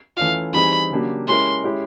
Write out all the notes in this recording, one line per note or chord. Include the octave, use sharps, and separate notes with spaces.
E3 A3 C#4 F4 F5
E3 G3 C4 D#4 G#4 B5
C#3 F#3 A#3 D4 G4
G#3 C#4 E4 G4 A#4 C6
G#3 C#4 E4 G4